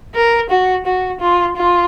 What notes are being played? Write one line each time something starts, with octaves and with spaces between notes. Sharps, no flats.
A#4
F#4
F#4
F4
F4